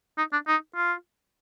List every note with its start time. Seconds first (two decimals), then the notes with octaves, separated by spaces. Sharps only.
0.18 D#4
0.33 D4
0.47 D#4
0.76 F4